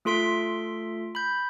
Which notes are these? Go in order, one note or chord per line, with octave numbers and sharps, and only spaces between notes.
A3 F4 A4 C6 B6 D7
B5 G6